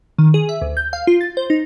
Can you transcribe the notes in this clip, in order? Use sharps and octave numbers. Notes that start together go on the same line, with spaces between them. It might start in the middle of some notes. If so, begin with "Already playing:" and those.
D#3
G#4
E5
D2
G6
F5
F4
A6
C5
D#4